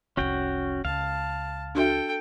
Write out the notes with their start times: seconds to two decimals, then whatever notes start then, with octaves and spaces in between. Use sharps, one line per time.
0.17 F1 C2 C#4 F#4 G5
0.85 C#2 F5 A5
1.75 D4 F#4 A4 E5 G5